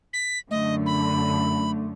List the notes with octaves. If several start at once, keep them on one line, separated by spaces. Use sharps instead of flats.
B6
F#2 D3 A3 D#5
B5